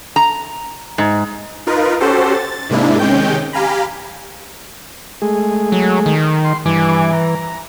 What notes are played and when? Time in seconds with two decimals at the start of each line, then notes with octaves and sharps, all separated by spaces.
0.16 A#5
0.98 G#2
1.67 D#4 F4 A#4 B4
2.00 C#4 F#4 G4 A4 C5
2.34 A6
2.70 G#2 C3 G#3 A#3 D4 E4
2.99 C3 D#3 G#3 C#4 G5 G6
3.53 G4 F5 G#5 A#5 B5
5.22 G#3 A3 G#4
5.72 F#3
6.06 D#3
6.45 C6
6.66 G2 E3 G#5 D6
7.13 A#5